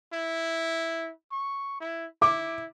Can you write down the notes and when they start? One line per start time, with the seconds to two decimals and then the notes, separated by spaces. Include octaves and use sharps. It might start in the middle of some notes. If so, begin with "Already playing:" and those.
0.13 E4
1.31 C#6
1.80 E4
2.22 E4 D6